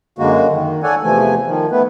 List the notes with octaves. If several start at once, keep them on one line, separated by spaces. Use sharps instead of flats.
F#2 D3 G#3 A#3 F#4
D#3
A4 C#5 D5 F#5 G#5
E2 C3 E3 F3 A3 G#5
D#3 F3
A3 B3 B4